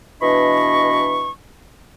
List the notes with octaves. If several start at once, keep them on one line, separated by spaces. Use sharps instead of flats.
B2 E3 D4 D#5 B5 C#6